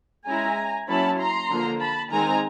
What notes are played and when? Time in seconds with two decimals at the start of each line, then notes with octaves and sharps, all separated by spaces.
0.26 G#3 C#4 E4 G#5 A#5
0.88 F#3 A#3 C#4 E4 A5 B5
1.19 A#5 C6
1.50 D3 F3 A#3
1.80 A5 B5
2.11 D#3 G#3 C4 D#4 G#5 A#5